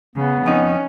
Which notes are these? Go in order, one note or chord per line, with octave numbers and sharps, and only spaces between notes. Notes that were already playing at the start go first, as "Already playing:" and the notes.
C#3 B3
F2 C#4 D#4